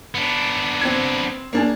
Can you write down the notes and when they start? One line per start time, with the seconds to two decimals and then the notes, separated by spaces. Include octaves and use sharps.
0.15 B3 D4
0.81 C4 G#6
1.53 A#3 D4 G#4